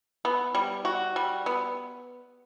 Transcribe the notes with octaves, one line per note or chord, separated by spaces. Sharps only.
B3
G3
F#4
G3
B3